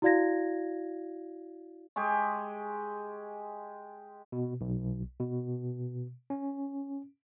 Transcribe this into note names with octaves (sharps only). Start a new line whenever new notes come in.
E4 F#4 D5 F5 G#6 A#6
G#3 G4 G#4 C#6
B2
B1
B2
C#4